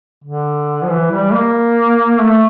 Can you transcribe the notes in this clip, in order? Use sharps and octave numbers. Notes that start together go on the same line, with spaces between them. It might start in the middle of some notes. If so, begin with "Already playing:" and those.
D3
F3
E3
G3
A#3
A3